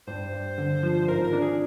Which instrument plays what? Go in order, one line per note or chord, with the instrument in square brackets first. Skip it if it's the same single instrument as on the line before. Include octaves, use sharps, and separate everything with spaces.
[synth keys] G2 [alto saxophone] C5
[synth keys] G2
D3
F3
[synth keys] G#1 [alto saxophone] A#4
[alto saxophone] A#4
[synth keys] D4
[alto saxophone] G#4